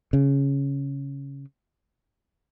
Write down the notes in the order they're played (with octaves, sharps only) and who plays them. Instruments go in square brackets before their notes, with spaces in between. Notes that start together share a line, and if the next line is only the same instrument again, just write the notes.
[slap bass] C#3